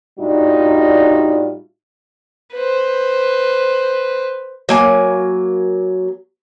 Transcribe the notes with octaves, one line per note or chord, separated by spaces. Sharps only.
A2 G3 D4 D#4 F4 F#4
B4 C5
F#3 A#3 G#5